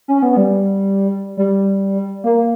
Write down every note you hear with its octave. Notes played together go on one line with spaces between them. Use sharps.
C#4
B3
G3
G3
A#3